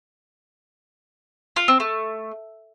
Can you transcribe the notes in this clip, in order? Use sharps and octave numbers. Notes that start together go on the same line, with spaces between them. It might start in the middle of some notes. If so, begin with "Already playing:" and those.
F4
C4
A3